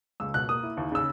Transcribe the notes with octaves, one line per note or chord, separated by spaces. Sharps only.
C#2 E6
B2 F#6
A#3 D#6
E4
D#2
C#3 E6